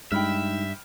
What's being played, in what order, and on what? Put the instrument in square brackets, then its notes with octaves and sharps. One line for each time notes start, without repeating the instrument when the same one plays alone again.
[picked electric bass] G2 [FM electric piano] G#3 D#4 [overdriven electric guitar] E5 [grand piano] G5 B5 F6